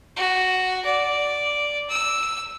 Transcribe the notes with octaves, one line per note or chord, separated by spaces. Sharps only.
F#4
D5
E6